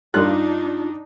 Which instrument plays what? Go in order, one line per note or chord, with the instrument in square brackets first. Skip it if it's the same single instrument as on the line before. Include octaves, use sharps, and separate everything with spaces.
[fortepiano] G2 F#6 [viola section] D4 D#4 [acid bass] F4